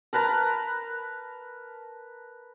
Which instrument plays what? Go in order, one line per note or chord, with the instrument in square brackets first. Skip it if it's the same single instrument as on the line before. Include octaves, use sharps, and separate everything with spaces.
[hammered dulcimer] A#4 B4 A5 A#5